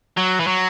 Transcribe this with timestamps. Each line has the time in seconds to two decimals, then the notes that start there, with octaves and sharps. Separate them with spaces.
0.17 F#3
0.40 E3
0.47 F#3